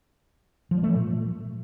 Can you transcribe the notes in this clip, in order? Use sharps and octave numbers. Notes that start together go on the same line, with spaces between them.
F3
G3
A3
F3
A#2